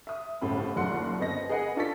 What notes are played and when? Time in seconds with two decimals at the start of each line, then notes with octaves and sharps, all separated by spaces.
0.07 E5 D#6
0.41 G1 C2 A2 C#3 C4 B5
0.76 F#1 D#2 A#2 F#5 C6
1.19 G1 B3 C4 D#5 A#6
1.49 G#4 A#4 B4 D#5 F#5 G#5
1.76 D4 F4 A4 C#6 A6 B6